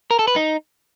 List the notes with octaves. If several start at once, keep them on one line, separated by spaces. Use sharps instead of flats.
A#4
A4
B4
D#4